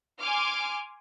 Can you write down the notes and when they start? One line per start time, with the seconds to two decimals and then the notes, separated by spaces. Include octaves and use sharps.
0.20 G#5 C6 D6 F6